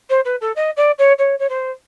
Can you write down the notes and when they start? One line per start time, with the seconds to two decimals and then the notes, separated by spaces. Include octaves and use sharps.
0.10 C5
0.25 B4
0.41 A4
0.56 D#5
0.77 D5
0.98 C#5
1.18 C#5
1.39 C#5
1.49 C5